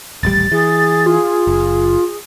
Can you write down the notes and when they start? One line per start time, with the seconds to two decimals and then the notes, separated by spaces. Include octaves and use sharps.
0.23 D#1 A1 G3 A6
0.52 E3 G#4
1.06 F4
1.47 F#1